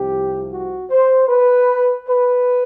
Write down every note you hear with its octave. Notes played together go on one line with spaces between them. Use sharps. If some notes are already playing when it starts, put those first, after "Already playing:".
Already playing: C2 C3 F3 G4
F#4
C5
B4
B4